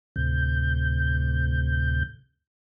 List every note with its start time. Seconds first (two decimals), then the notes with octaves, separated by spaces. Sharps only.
0.16 D2 A2 C3 G6